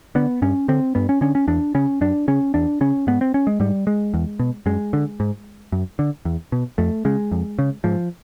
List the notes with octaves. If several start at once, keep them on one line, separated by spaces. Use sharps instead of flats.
D3 B3
G2 C#4
D3 C4
G2 B3
C#4
D3 C#4
C#4
E2 D4
C#3 C#4
F#2 D4
C#3 C#4
E2 D4
C#3 C#4
G#2 B3
C4
C#4
G#3
G#2 G3
G#3
E2
B2
F#2 G#3
D3
G#2
F#2
D3
E2
B2
F2 A3
C#3 G#3
F2
C#3
G#2 F3